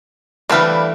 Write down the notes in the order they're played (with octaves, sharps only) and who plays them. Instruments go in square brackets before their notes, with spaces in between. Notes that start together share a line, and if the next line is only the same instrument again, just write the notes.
[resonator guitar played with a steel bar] E3 A3 [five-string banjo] G3 D4 B4 [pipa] C4 F5